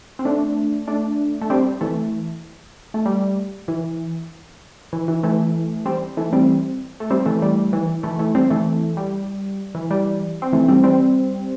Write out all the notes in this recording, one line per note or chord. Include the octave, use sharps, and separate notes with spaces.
C4
A3 D4
A3 D4
A3
G3 C4
E3 A3
A3
G3
E3
E3
E3
E3 A3
G3 C4
E3 A3
G3 C4
A3
G3 C4
E3 A3
G3
E3
E3 A3
E3 A3
G3 C4
E3 A3
G3
E3
G3
C4
E3 A3
G3 C4
G3 C4